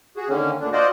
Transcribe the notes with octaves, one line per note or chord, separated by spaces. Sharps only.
F#4 G#4
D3 D#3 A#3 C#4
D2 A#2 D3 D4
F4 F#4 C5 D5 D#5